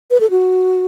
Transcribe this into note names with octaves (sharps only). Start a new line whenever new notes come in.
B4
A4
F#4